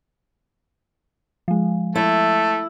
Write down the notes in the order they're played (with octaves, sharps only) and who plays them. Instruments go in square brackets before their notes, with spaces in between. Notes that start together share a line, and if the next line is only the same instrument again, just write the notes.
[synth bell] F3 G#3
[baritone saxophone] A3 [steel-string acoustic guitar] E4